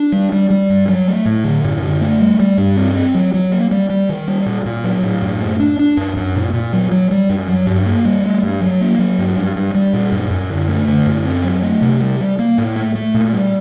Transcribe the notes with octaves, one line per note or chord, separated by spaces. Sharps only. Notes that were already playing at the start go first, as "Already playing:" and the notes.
Already playing: D4
G3
G3
G3
G2
F#3
A3
A2
D3
F#2
D3
A3
G3
G3
G2
C4
C4
F#3
F#3
A#3
G3
G3
D#3
G3
A#2
A#2
F#3
A2
F#2
A3
D4
D4
F#2
F#2
A#2
A#2
F#3
F#3
G3
F#2
F#3
G2
A#3
G3
A3
G2
F#3
A#3
F#3
G2
G2
G2
G3
A#2
F#2
F#2
D3
A3
D3
F#2
C4
F#3
A3
C3
G3
G3
A#3
A2
A3
A3
A#2
G3